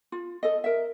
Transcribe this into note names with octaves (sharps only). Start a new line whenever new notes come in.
F4
A4 D#5
A#4 E5